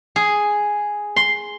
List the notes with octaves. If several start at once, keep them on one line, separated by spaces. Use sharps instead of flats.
G#4
C6